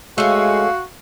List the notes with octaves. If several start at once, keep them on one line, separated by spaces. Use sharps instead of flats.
G#3 A3 C#4 F#4 F5